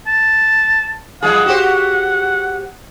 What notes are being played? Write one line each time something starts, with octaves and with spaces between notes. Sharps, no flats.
A5
F3 G3 G#4 F#5
F#4 G4 C5